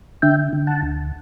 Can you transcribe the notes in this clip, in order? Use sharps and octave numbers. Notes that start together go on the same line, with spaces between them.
D3 E5 G5
D3
F#5 A5
D2